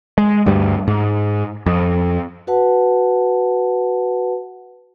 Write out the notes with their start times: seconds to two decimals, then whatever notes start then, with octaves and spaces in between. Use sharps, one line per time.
0.18 G#3
0.46 D2 G2 G3
0.88 G#2
1.66 F2
2.47 F#4 B4 F#5 A5